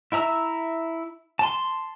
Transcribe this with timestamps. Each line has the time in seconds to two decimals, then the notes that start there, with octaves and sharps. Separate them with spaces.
0.12 E4 E5 A#5 E6
1.39 A5 C6